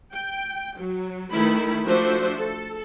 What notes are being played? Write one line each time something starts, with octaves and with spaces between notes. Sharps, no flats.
G5
F#3
D#3 A3 E4 B4 B5
F3 A3 D4 F#4 C5 E5
A4